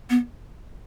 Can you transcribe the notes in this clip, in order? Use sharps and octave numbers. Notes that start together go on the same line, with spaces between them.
B3